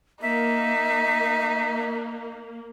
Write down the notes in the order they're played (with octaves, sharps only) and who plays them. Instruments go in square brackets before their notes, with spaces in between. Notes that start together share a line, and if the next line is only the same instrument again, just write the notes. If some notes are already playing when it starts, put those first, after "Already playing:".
[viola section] A#3 [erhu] D#4 [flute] E5